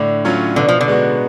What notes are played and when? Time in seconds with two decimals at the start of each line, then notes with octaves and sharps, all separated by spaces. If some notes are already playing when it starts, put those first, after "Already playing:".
Already playing: A2 D3
0.25 F#3 C#4 F4
0.56 B2 D3
0.68 F3
0.81 D3
0.88 G#3 B3 F#4